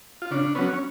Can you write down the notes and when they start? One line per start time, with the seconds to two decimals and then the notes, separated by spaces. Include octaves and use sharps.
0.22 F4
0.31 C#3 D4
0.55 F#3 B3 C#4
0.74 C#4